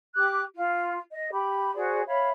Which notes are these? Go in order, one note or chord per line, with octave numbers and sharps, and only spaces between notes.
G4 D6 F#6
F4
D#5
G4 B5
F#4 G#4 C5 D5
C#5 E5 F5 B5